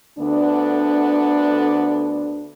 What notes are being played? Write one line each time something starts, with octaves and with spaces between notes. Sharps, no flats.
D2 D3 B3 D4